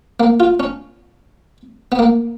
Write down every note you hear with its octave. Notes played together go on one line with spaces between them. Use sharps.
A#3
F4
C#4
B3
A#3